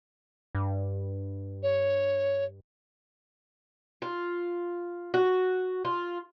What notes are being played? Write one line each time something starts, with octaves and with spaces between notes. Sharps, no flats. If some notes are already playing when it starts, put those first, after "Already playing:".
G2
C#5
F4
F#4
F4